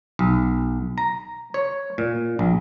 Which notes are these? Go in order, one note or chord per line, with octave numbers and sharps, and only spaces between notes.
B1
A#5
C#5
A#2
A#1